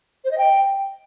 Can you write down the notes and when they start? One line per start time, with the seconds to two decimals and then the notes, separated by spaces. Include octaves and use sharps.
0.24 C5
0.31 D#5
0.37 G5